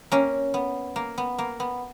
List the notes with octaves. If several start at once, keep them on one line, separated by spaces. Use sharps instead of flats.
A#3 C#4
B3
A#3
B3
A#3
B3